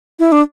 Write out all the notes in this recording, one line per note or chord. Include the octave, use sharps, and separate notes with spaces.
E4
D4